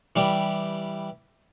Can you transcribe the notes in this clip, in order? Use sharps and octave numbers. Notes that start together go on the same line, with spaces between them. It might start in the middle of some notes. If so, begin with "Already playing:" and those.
E3 G3 G4